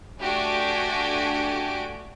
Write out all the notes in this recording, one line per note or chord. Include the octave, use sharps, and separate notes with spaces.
A3 D4 F#4 G4 G#5 D7